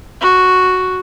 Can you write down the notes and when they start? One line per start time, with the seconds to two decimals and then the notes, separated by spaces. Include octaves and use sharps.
0.21 F#4